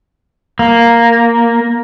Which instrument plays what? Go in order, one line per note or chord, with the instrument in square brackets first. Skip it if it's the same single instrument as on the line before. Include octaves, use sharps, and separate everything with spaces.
[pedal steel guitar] A#3